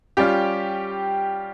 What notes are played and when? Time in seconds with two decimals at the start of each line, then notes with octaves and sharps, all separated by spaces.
0.17 G3 C#4 F4 G4 G5